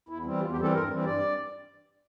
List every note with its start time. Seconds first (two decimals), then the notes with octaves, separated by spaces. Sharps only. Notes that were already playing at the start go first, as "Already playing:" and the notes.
0.09 E2 E4
0.25 E3 G3 C4
0.41 E2 F4
0.52 G4
0.58 E3 G3 C4 A4
0.73 G2 A#4
0.89 E3 G3 C4
1.04 G2 D5